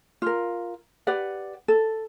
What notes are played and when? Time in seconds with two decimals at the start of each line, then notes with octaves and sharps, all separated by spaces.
0.22 F4 A#4
1.07 G4 B4 D5 F#5
1.68 A4